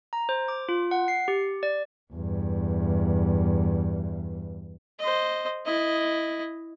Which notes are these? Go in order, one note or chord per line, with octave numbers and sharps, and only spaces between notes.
A#5
C5
D6
F4
F#5
C7
G4
D5
E2 G2
C5 D#5
E4 D#5